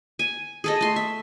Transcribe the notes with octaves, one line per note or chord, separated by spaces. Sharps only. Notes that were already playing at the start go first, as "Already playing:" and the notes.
G#5
G#4 A4 D#5
A3 C6
E5